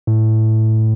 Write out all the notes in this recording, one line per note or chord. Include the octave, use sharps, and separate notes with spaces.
A2